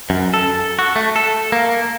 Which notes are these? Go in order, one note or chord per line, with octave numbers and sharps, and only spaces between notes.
F#2
A4
F#4
A3
A4
A#3